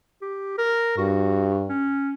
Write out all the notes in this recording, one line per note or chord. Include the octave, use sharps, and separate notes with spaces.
G4
A#4
G2 F#4
C#4